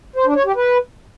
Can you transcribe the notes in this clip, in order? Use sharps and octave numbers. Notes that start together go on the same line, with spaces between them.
C5
D4
C#5
G4
B4